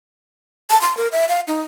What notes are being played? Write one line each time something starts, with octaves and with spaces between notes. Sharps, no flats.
A5
C6
A#4
E5
F5
D#4